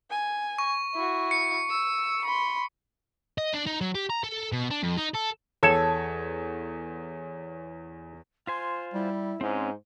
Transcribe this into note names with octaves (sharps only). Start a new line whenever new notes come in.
G#5
C#6
E4 F#4
C#7
E6
B5 C6
D#5
D4
D#4
F#3
G4
A#5
A4
B2
D4
F2
D#4
A4
E2 A4 C#5 G#6
F4 C5 G#5 C6
G3 E4
G#2 C4 C#4 C5